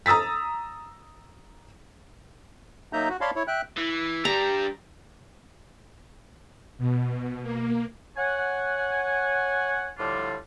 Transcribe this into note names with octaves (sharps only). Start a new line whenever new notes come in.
A#5 D#6 E6 A6 B6
F#3 A#3 D#4 E5 A#5 G6
F#4
C#5 D5 F5 A5 B5 C6
E4 C#5
E5 G5 F#6
E3
G3 D4 G4 A#5
B2
A#3
C#5 F#5 G#5
A2 D3 F3 G3 D4 F4